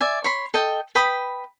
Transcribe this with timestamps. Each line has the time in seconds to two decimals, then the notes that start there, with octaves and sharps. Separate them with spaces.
0.01 D5 E5 G#5
0.24 C#5 B5 C6
0.54 A4 D#5 G5
0.95 B4 G5 B5 D#6